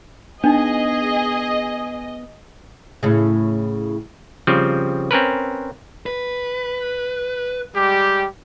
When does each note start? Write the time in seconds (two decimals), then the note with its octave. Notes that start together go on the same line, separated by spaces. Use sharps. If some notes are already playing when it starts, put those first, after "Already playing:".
0.44 B3 D4 D#4 G#4 D#5
3.03 A2 C#3
4.47 C#3 F3 G3 C4
5.11 C4 C#4 A#4 B4
6.06 B4
7.75 G3 G#3 G4